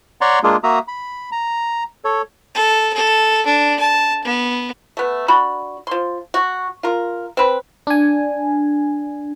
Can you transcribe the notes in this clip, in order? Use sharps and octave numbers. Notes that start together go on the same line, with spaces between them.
C#5 D5 F#5 A#5 C6 C#6
G#3 A#3 D4 F4 G#4
A#3 F#4 E5 A#5 D#6
B5
A#5
A4 C#5
A4
A4
D4
A5
B3
A3 B3
D4 F#4 B5
F3 C6
F#4
F4 A#4
C4 B4
D4 G#5